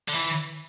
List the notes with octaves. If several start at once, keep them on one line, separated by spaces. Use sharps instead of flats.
D3
E3